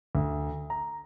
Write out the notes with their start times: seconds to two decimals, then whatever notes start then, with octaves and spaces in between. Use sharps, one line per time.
0.15 D2
0.70 A#5